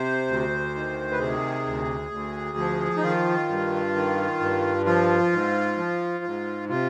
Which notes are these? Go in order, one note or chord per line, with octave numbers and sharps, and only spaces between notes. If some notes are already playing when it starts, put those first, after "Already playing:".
Already playing: C3 C5
D2
D#3
B4
C3 G#4
D2
D2
F3
D#4
D#3 F4
G2
D#3
G2
F3 F4
G#2
F3
G#2
C3 F4